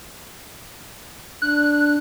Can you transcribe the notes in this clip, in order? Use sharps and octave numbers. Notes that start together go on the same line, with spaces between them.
D4 F#6